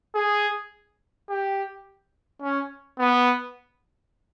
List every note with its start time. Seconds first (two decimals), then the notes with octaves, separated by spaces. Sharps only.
0.15 G#4
1.29 G4
2.42 C#4
2.99 B3